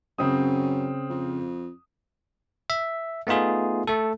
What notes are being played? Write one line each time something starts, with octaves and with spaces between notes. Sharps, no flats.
F#2 C#3 C4 D#6
F2
E5
A3 B3 D#4 F4 G#4
A3 A4